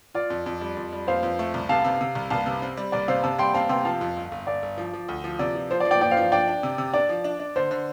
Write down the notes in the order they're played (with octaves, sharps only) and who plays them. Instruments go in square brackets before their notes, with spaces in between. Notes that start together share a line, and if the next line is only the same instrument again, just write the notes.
[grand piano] F4 [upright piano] D5
[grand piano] F2
F2
G3
F2
G3
[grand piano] F2 [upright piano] C5 F5
[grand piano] F2
A3
C2
[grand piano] C3 [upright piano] F5 A5
[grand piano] C3
C3
C2
[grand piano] C2 [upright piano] F5 A5
[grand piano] C3
C4
G3
[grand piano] C2 [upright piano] D5
[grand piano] C3 [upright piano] C5 F5
[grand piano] C3 [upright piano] F5 A5
[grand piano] G3 [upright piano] G5 C6
[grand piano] C4 [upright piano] F5 A5
[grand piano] C3 [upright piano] G5 C6
[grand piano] F3 [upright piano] F5 A5
[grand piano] F2
G1
G1
[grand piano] G1 [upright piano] D5
[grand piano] G1
F3
F3
D2
F3
[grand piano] C3 [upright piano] D5
[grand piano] F3
[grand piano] F3 [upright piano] C5
[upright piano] D5
[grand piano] F3
[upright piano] D5 G5
[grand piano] F3 [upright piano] D5 G5
[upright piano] C5 F5
[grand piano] F3
[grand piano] D4 [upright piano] D5 G5
[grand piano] D4
C3
C3
[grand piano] D4 [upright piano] D5
[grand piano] F3
D4
D4
[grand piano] D3 [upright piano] C5
[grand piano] D3